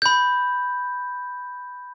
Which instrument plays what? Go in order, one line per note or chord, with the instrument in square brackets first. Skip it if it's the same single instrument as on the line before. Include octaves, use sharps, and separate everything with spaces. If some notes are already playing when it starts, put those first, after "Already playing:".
[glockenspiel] B5 G6